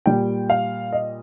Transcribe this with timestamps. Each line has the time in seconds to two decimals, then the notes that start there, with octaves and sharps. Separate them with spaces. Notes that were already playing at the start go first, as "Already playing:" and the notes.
0.06 A#2 G3 G5
0.50 F5
0.93 D#5